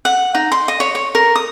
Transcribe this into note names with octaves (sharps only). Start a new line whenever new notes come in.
F#5
D#4
C6
D#5
C#5
C#5
A#4
D#6